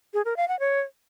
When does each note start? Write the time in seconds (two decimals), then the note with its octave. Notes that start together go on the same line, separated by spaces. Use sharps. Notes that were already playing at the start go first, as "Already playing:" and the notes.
0.14 G#4
0.25 A#4
0.37 F5
0.48 F#5
0.60 C#5